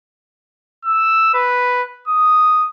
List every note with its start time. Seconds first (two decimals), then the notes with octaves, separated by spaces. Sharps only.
0.85 E6
1.34 B4
2.08 D#6